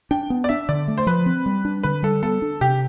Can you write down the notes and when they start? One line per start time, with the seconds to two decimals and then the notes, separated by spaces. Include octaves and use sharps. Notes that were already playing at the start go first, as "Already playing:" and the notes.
0.11 D4 G5
0.30 B3
0.44 D5
0.49 D4 E5
0.69 D3 D5
0.88 A3
0.98 C5
1.07 F3 B4
1.26 C4
1.46 G3
1.65 D4
1.83 D3 B4
2.03 G3 A4
2.22 B3 A4
2.42 D4
2.61 C3 G4